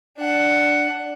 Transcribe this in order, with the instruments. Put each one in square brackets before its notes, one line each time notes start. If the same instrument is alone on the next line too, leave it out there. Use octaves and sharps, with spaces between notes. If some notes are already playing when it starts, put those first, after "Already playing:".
[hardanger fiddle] D4 F#5